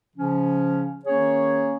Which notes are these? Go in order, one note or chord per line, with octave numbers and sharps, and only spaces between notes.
C#3 F3 C#4
D#3 A#3 C#4 G#4 C#5